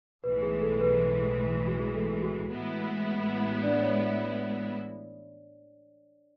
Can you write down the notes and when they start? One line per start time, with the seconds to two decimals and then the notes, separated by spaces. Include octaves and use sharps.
0.23 B1 A2 E3 G#3 B4
0.42 G#4
0.61 A4
0.81 B4
1.67 F#4
1.80 G#4
1.94 A4
2.22 F#4
2.50 A1 A2 G#3 B3 E4
3.63 D4 D5
3.82 C#5